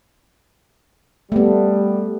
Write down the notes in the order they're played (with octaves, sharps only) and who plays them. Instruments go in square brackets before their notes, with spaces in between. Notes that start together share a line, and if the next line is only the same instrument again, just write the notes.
[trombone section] G3 [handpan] A3 B3